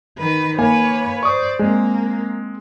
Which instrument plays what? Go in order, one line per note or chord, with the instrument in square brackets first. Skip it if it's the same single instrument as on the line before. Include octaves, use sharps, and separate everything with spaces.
[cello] D#3 B4
[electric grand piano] A#3 G#5 [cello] B4 C#5
[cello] C5 D5 [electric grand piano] C#6 D#6
[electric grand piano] G#3 C4 [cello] A#3